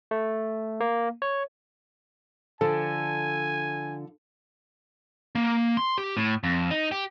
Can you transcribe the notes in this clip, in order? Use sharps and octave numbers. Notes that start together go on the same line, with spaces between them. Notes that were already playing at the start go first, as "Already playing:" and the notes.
A3
A#3
C#5
D3 F3 A4 D5 G#5
A#3
C6
G4
A2
F2
D#4
G4